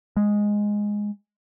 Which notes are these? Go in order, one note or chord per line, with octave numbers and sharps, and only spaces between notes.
G#3